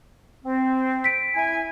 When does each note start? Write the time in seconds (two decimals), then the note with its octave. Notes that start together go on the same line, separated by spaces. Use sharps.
0.45 C4
1.04 B6 D7
1.35 E4 G#5